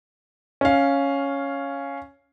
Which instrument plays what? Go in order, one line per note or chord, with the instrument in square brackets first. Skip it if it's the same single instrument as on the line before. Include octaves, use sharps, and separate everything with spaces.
[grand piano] C#4 F5